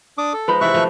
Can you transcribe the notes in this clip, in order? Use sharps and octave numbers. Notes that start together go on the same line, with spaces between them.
D4 D6 D#6
A4
F3 G#3 D#4 B4 B5
C3 E3 D5 E5 C#6 F#6
D#3 F3 A3